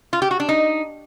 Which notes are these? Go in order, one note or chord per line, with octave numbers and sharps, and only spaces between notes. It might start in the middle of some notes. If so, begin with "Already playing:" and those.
F4
G4
F#4
D4
D#4